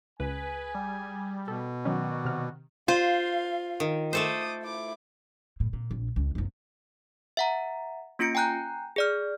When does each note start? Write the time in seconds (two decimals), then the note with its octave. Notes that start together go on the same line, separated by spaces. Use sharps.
0.20 C#2 G#4 B4 G#5
0.75 G3
1.48 B2 A4
1.85 D#3 F#3 C#4 F#4 D5
2.25 C3 F6
2.88 F4 C5 F5
3.80 D#3
4.13 A3 A4 C5 D6 D#6
4.63 E4 D6
5.60 A2
5.73 A#2
5.91 A#1
6.16 C#2
6.35 F#1 C2
7.37 E5 F#5 A#5
8.19 A#3 C#4 F4 A#6 C#7 D7
8.35 G5 G#5 A#5 F#6 G6
8.96 G#4 D5 F6